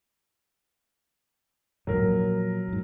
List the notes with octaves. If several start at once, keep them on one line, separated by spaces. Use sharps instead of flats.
A#1 E2 G#2 F#3 A#4
A#2 F3
F2 G#2